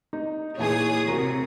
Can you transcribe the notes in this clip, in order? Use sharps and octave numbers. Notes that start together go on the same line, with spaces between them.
D#4
A#2 E3 G#4 C#5 G#5 D#6
C3 F#4 A#4 A#5